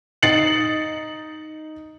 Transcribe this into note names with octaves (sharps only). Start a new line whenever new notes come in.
D#4 A6 C7 C#7 F#7